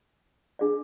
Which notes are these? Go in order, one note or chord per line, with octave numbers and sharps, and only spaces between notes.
D4 G#4 D5